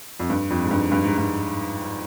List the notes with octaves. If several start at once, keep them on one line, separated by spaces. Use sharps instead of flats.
F2
G2
F2
G#2
G2
G2
G#2
G2